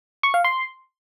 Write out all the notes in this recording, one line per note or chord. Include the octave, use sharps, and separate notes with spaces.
C#6
F5
C6